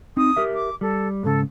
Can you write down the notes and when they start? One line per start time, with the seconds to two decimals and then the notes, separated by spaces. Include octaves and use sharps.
0.17 C4 D#4 D#6
0.37 G4 A#4 E5
0.54 D6
0.81 G3 A4
1.23 G#2 C#3 A4